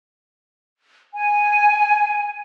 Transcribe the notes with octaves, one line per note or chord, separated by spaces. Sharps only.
G#5